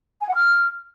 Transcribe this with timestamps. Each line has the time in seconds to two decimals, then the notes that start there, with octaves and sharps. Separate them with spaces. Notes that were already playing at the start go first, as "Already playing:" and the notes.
0.21 G#5
0.28 F#5
0.34 F6